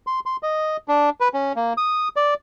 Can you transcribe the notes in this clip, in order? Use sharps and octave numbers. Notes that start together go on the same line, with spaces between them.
C6
C6
D#5
D4
B4
C#4
A#3
D#6
D5